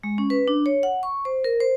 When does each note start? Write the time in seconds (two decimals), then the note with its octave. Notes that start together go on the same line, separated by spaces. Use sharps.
0.03 G#3
0.18 C#4
0.30 B4
0.48 D4
0.66 C#5
0.83 F#5
1.03 C#6
1.25 C5
1.44 A#4
1.60 C5